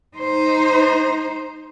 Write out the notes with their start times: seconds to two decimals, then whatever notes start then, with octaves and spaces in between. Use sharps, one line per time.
0.17 D#4 C5